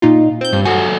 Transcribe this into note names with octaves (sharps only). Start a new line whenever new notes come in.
A#2 D#4 F4
C4 G6
G2
F#3 F#4 A4 G#5